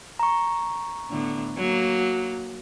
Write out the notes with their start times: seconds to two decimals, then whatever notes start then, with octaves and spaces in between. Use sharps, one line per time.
0.19 A#5 C#6
1.09 A2 D3 B3
1.57 F#3 A#3